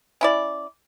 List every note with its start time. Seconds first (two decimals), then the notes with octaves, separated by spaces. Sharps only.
0.21 C#4 E4 D5